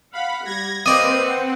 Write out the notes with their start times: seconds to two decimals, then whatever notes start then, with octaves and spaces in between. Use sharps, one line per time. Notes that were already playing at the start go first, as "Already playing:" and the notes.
0.13 F5 F#5 B5
0.45 G3 G#6 A#6
0.86 A#3 C4 B4 D5 D#5 F5
1.22 F#5